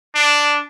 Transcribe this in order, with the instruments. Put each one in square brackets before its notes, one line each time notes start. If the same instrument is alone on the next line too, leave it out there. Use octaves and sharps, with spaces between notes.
[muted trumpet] D4